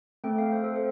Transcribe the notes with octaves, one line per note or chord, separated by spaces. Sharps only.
A3 C4 A4 G5
F5
C5
A4
C5